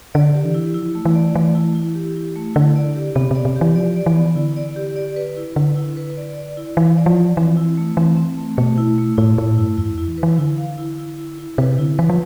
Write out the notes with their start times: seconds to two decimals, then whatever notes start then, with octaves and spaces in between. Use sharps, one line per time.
0.14 D3 D5
0.34 G4
0.45 E3
0.54 E4
0.74 F3 E4
0.95 A3
1.05 E3
1.15 D5
1.35 E3 A3
1.55 E4
1.75 E4
1.95 G4
2.15 E4
2.36 A3
2.55 D3 E4
2.76 D5
2.96 G4
3.15 C3 B3
3.31 C3 D5
3.45 C3
3.56 G4
3.61 E3
3.75 F3 D5
3.96 D5
4.06 E3
4.16 B3
4.36 D3 E4
4.56 D5
4.76 G4
4.96 D5
5.16 B4
5.36 E4
5.56 D3 B4
5.76 E4
5.97 B4
6.17 D5
6.37 D5
6.57 E4
6.77 E3 F5
6.97 D5
7.06 F3
7.17 D5
7.37 E3 C4
7.57 E4
7.77 A3
7.97 E3 C4
8.17 C4
8.37 A3
8.57 B2 A3
8.78 E4
8.98 A3
9.17 A2 E4
9.37 A2 A3
9.58 G2 E4
9.77 E2 E4
9.93 F2 E4
10.08 E3
10.18 B4
10.23 E3
10.38 D3 E4
10.58 F5
10.78 E4
10.99 E4
11.18 E4
11.38 E4
11.58 C3 B4
11.78 D3 E4
11.99 E3 B4
12.10 F3